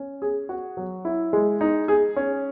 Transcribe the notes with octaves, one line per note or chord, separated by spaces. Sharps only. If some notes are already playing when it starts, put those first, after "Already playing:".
Already playing: C#4
G#4
F#4
F#3
E4
G#3
D#4
G#4
C#4